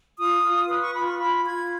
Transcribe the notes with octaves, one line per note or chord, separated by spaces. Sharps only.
F4 D#6
F4
B4 D#6
C#6
F4 B5
C#6
F4 B5
F4 G#6